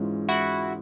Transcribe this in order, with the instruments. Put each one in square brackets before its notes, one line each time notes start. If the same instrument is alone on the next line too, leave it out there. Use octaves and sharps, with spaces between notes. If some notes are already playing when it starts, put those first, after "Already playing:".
Already playing: [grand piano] G#2 E3 G#3 C#4 F4
[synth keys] E4 F#4